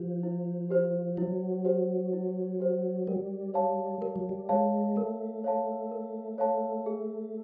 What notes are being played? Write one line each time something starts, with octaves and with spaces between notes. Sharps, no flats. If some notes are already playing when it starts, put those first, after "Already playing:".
Already playing: F3 G4 C5
E4
G4 C5
F#3 E4
G4 C5
E4
G4 C5
G3 A#4
C#5 F5 A5
G3 A#4
F#3
G3
G#3 C#5 F5 A5
A3 A#4
C#5 F5 A5
A#4
C#5 F5 A5
G#4